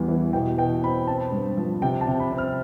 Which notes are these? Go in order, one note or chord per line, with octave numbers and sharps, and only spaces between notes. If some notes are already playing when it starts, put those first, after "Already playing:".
Already playing: E2 G3 B3
E3
B2 G5
B2 G5
C4 B5
C4 A5
G2
F3
C3 G5
A5
C3
B5
C4
F6